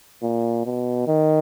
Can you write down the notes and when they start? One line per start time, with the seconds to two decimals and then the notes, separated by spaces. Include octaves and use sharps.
0.22 A#2
0.65 B2
1.08 D#3